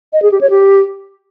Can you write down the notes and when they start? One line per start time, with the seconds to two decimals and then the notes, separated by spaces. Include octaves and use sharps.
0.13 D#5
0.22 G#4
0.32 G4
0.41 C#5
0.50 G4